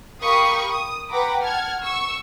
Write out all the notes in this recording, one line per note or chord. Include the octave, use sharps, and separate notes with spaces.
G4 A#4 F5 B5 C#6 D#6
D#6
B4 F#5 G5 A#5 B5 D6
F#5 A5 F6 G#6
C#6 E6